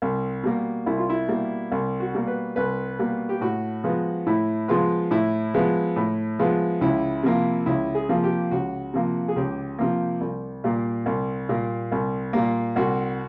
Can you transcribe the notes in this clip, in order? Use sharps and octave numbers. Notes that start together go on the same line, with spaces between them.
C2
B2 G3 A#3
C2 E4
F4
E4
B2 G3 A#3
C2
F#4
B2 G3 A#3
B4
C2 B4
B2 G3 A#3
G4
A2 F#4
F3 G#3 B3
A2 E4
F3 G#3 B3 F4
A2 E4
F3 G#3 B3
A2
F3 G#3 B3
C#2 E4
C3 F3 A#3
C#2 E4
G#4
C3 F3 A#3
G4
C#2 F#4
C3 F3 A#3
G#4
C#2 G4
C3 F3 A#3
C2
A#2 G3 A#3
C2
A#2 G3 A#3
C2
A#2 G3 A#3
C2 F#4